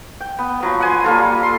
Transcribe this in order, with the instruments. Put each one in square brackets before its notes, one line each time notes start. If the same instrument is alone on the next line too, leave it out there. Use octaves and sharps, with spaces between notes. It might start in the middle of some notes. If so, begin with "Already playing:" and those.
[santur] G5
B3
F3 F#3 B3
F#5 G#5 C6
G3 A#3 F4 A4
C6